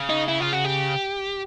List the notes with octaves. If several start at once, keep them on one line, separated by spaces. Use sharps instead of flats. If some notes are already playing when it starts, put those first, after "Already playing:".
Already playing: C#3
D#4
E4
F4
F#4
G4